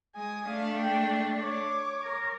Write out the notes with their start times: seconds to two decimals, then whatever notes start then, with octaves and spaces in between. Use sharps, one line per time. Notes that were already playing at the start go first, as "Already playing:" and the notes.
0.15 G#3 G#5 D#6
0.47 A3 D4 F5
0.78 G5
1.39 C#5 D6
2.03 A#4